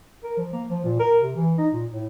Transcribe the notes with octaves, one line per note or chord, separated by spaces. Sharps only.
A#4
F3
A#3
F3
A#2
A#4
C3
E3
D#4
A#2
A2